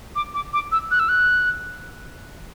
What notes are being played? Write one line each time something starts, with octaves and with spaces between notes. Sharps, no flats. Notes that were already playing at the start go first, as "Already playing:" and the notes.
D6
D6
D6
E6
F#6
E6
F#6